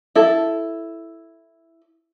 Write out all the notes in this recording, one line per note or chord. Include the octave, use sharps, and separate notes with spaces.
E4 A4